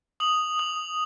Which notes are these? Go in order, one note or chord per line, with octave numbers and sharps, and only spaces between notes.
D#6 F#7
D#6 F#7